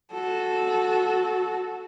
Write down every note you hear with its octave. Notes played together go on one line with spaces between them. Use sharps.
F#4 A4